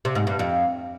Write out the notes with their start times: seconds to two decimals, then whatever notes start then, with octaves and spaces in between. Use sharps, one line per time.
0.05 C3
0.15 G#2
0.27 G2
0.39 F2